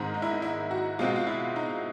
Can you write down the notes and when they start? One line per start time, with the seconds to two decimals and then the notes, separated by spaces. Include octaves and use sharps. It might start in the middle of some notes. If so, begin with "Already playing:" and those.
Already playing: G#2 D#3 G#3 C4
0.14 D#4
0.22 E4
0.31 D#4
0.42 E4
0.71 F#4
0.99 B2 G#3 C4 F4
1.08 F#4
1.16 F4
1.27 E4
1.56 D#4